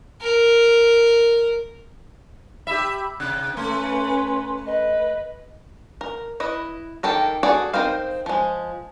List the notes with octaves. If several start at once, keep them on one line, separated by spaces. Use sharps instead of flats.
A#4
G4 E5 B5
C3 F#6
A3 C#4 B4 C6
B4 D#5
A#4
E4 B4 D#5
D#3 G4 A4 A#4
F#4 G#4 A4 D5
C4 D#4 A#4 C5 F5
F3 G#3